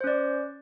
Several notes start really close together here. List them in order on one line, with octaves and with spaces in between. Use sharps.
C5 C#4 D5